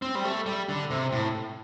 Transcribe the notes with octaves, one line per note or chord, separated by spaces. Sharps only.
C4
G3
A3
G3
D3
C3
A2